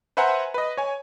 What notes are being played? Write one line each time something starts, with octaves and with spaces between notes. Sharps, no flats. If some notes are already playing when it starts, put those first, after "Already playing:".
B4 C5 E5 F#5 G#5 A#5
B4 D#5
C#5 G#5